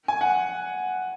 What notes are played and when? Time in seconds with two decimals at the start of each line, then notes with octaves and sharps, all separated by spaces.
0.08 G#5
0.21 F#5